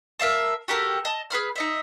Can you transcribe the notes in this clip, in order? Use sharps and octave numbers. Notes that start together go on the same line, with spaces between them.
A#4 E5 F5 A5
F#4 G4 A4 A#4
D#5 A5
G#4 B4 B5 F6
D#4 D#5 E5